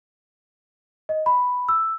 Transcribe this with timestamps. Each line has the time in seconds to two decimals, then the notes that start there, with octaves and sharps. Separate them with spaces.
1.09 D#5
1.26 B5
1.69 E6